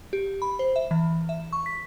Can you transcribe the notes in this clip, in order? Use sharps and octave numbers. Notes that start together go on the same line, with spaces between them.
G4
B5
C5
E5
E3
E5
C#6
B6